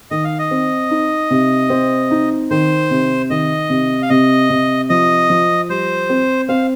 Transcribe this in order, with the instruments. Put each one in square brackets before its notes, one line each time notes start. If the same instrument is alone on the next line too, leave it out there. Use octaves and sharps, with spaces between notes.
[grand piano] D#3 [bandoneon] D#5
[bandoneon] F5
D#5
[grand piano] C4
D#4
C3
C4
D#4
[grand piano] D#3 [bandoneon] C5
[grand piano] C3
[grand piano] D#3 [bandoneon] D#5
[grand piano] C3
[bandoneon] F5
[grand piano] C3 [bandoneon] D#5
[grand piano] C3
[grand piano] F3 [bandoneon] D#5
[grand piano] F3
[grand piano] G3 [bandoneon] C5
[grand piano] C4
[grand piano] C4 [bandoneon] F5